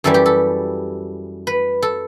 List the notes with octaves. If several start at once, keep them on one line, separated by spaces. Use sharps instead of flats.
F#2 E3 G3 A4
G4
A4
B4
A4